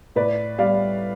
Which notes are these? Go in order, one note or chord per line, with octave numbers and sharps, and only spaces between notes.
A2 B4 D5
G3 D5 F5